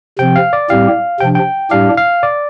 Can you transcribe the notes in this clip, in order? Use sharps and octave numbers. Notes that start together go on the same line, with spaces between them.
C3 F3 C4 G5
F5
D5
A2 G3 C4 G4 F5
C3 F3 D4 G5
G5
A2 G3 D4 G4 F5
F5
D5